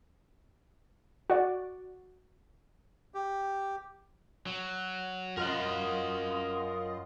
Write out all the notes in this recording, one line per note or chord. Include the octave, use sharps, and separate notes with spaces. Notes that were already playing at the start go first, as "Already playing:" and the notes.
F#4 D5
G4
F#3
F#2 F4 A#4 D#5 F#5